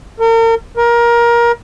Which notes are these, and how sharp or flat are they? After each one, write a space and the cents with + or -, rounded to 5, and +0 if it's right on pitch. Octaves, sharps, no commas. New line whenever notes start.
A#4 -40
A#4 +20